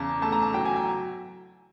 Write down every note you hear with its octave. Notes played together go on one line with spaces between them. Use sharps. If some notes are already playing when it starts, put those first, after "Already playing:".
Already playing: E2 C#3 A5 A#5
A3 A5
A#5
A5
F#3 G5
G#5
G5